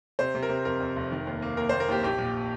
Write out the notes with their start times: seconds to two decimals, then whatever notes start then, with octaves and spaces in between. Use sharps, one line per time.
0.19 C3 C5
0.35 C3
0.43 A#4
0.49 C3
0.65 F2 A#4
0.80 F2
0.96 F1
1.12 D#3
1.27 D#2
1.42 A#3
1.57 D#2 A#4
1.69 D#2 C5
1.80 A#4
1.88 D#2 G4
2.03 A#1 G4
2.18 A#2